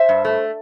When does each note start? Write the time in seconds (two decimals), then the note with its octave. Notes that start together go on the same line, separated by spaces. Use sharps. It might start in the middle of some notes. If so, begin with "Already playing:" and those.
Already playing: C5 E5
0.09 G2
0.25 A3